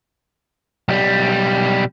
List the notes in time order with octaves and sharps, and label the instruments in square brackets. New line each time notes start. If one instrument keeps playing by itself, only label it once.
[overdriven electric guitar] B1 G3